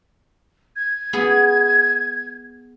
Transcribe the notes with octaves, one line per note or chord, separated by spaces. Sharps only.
G#6
B3 G#4 G#5